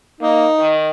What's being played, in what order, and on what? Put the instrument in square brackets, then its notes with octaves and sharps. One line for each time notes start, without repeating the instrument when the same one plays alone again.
[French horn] A#3 [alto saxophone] D#4
[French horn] D#3